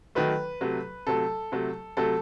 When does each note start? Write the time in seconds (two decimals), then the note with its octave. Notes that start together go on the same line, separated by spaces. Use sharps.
0.15 D#3 F#3 A3 B4
0.61 C3 F#3 A3
1.07 C3 F#3 A3 A4
1.52 C3 F#3 A3
1.97 C3 F#3 A3 A4